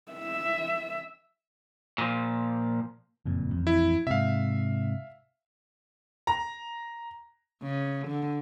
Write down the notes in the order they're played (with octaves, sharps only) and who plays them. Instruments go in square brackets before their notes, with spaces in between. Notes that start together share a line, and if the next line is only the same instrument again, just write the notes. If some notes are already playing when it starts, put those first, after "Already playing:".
[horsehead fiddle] E5
[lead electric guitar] A#2 F3
[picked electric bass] F#1 F2 A#2
A1 F2
[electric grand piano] E4
[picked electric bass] G#2 C3 [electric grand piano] E5 F5
[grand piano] A#5
[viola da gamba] C#3
D3